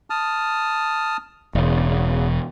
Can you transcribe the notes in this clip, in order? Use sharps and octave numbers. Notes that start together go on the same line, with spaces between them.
A5 D#6 F6
E1 E2 C#3